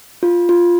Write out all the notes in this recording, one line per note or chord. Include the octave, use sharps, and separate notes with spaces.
F4
F4